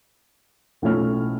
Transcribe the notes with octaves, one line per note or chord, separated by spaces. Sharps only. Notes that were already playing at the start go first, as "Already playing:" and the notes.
B1 A2 F3 A3 C#4 F6